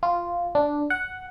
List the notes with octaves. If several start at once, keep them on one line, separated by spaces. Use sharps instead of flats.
F4
D4
F#5